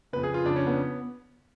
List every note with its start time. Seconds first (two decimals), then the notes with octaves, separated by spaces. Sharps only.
0.13 C#3 B4
0.16 F2
0.23 G#4
0.34 F4
0.45 F2 C#3 D4
0.56 C#4
0.67 B3